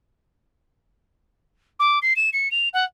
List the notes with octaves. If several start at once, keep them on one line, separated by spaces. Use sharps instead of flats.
D6
C7
E7
C#7
F7
F#5